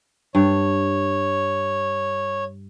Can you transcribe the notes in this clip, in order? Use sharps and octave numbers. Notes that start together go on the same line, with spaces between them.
G2 C#5